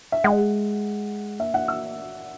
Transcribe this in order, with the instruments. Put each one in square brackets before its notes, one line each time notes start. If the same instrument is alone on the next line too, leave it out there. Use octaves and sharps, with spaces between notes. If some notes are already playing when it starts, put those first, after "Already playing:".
[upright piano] E5
[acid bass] G#3 [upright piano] F#5
[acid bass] A#3 [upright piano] E5
[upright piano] F#5
E6